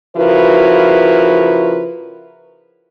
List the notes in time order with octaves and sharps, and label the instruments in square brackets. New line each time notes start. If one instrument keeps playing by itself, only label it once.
[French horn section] C#3 F3 E4 F#4 A#4 B4